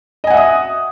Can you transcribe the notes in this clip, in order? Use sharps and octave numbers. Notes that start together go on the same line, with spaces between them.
D#5 E5 F#5 G#5 D#6